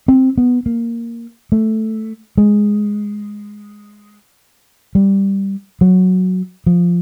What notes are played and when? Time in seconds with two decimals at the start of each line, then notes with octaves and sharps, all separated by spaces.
0.08 C4
0.38 B3
0.66 A#3
1.52 A3
2.38 G#3
4.95 G3
5.81 F#3
6.66 F3